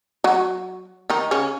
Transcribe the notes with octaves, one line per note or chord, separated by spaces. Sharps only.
F#3 F#4
D#3 D#4
C#3 C#4